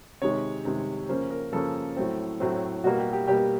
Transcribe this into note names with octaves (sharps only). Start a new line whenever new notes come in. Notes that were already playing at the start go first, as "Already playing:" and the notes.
C3 D#3 G#3 C#5
C3 D#3 G#3
C#3 F3 A#3 C#4 C5
A#4
C#3 F3 A#3 C#4 A4
A2 F#3 A3 C4
A2 F#3 A3 C4
B2 G3 A#3 F#4
G4
G4
B2 G3 A#3 G4